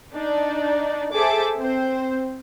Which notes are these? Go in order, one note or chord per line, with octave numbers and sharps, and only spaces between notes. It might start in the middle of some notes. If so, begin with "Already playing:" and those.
D4 D#4 D5
G#4 A4 C5 E5 A5 D6
C4 C5